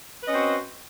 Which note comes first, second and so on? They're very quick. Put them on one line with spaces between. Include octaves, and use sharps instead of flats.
B4 D#5 C#4 C4 F#4